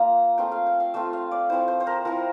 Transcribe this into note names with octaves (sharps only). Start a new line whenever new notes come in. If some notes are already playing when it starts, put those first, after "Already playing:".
Already playing: A#3 F4 G5 A#5
A3 C4 F4 G5
F5
G5
F5
A3 C4 F4 E5
F5
D5
F3 C4 E4 C5
C5
C5
A#4
F3 C4 E4 A#4